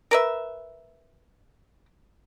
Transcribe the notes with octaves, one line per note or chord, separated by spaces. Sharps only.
A#4 B4 E5